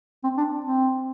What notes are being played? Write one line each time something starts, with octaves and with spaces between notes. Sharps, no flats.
C4
D4
C4